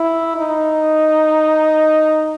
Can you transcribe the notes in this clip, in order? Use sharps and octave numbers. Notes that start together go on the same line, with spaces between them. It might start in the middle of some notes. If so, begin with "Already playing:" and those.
Already playing: E4
D#4